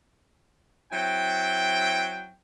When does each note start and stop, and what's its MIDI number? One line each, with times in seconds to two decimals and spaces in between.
0.92 2.35 54
0.92 2.35 60
0.92 2.35 64
0.92 2.35 79